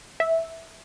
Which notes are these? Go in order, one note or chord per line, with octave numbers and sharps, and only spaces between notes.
E5